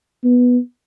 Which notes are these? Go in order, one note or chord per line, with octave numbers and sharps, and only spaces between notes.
B3